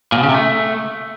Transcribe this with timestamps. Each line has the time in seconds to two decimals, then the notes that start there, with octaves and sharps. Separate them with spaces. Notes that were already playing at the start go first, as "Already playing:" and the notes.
0.12 A#2
0.18 B2
0.23 C#3
0.29 C3
0.34 A3